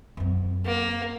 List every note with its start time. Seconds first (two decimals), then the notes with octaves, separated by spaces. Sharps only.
0.17 F#2 C4
0.65 A#3